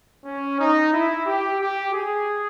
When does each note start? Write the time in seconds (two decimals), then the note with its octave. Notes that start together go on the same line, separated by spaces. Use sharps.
0.25 C#4
0.58 D#4
0.92 E4
1.26 G4
1.59 G4
1.92 G#4